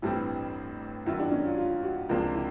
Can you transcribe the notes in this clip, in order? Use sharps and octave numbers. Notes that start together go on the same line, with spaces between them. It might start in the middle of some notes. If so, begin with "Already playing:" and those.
A1 G2 E3 G3 C4 E4
F#2 D#3 F#3 E4
D4
C#4
F4
F4
F#4
C#2 C3 F3 A#3 D4 F4
E4